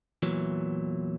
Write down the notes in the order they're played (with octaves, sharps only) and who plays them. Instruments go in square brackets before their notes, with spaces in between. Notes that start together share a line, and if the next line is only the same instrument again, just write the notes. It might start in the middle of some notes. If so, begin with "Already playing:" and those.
[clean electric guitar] E2 A#2 E3 F#3